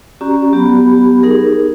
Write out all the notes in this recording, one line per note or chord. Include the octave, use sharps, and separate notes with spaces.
C#4 F#4 G4 D5 A#5
F#3 B3 G4 B5
D#4 G#4 A#4